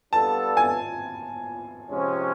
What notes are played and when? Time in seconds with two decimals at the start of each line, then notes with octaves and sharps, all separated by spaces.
0.12 G3 B3 D4 F4 A4 A5
0.57 G#5
1.90 C3 F3 G#3 C#4